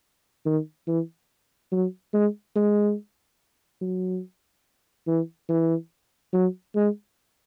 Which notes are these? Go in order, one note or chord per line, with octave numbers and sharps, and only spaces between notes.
D#3
E3
F#3
G#3
G#3
F#3
E3
E3
F#3
G#3